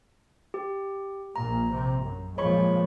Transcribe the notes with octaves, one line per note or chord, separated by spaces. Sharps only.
G4
A#1 A#2 A#5
C3
F#2
A#2 F3 G#3 C#5 B5 C#6